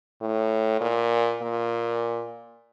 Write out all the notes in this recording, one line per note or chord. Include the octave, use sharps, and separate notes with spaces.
A2
A#2
A#2